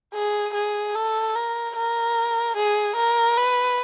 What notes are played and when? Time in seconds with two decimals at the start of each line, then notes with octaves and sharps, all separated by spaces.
0.14 G#4
0.54 G#4
0.95 A4
1.35 A#4
1.76 A#4
2.57 G#4
2.96 A#4
3.37 B4